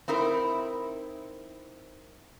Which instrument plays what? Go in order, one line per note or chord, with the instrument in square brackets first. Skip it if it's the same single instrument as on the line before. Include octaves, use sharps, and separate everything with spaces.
[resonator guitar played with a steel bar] C4 D#4 E4 A#4